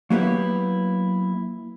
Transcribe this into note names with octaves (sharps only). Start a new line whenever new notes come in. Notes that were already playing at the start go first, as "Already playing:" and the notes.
F#3 A#3 B3 E4 G4